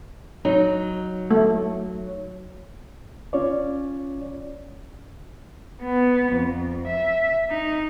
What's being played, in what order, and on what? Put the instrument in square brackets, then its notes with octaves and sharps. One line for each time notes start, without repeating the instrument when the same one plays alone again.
[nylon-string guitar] F#3 D#4
[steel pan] A3
[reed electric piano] C#4 F4 C#5 D5
[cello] B3
F2
E5
D#4